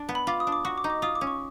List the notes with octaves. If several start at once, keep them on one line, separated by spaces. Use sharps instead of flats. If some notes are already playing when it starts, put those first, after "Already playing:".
Already playing: D4
B3
B5
F4 D6
D#6
D4
D6
F#4 C#6
D6
D#4
D6
F4 D#6
D6
C#4
C#6